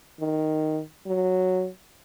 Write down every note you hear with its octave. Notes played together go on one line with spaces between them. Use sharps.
D#3
F#3